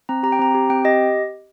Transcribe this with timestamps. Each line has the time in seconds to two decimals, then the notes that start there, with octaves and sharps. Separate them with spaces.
0.09 C4 A#5
0.23 G4 A#5
0.32 G5
0.39 C4 A#5
0.55 G4
0.70 C4 G5
0.84 G4 D#5